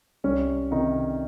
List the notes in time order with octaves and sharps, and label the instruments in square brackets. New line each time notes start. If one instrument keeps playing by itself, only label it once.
[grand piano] C2 C#4
C3 D#3 D#4